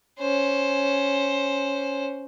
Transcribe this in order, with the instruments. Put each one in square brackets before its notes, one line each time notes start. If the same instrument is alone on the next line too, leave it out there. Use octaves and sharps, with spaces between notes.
[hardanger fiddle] C#4 C5